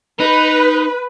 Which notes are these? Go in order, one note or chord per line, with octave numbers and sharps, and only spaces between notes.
D#4 B4